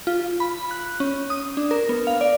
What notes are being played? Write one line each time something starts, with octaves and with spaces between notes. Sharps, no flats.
F4
B5
F#6
C#4
D#6
D4
A#4
B3
F5
D5